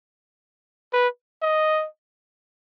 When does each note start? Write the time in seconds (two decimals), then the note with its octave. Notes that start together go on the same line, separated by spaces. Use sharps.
0.93 B4
1.42 D#5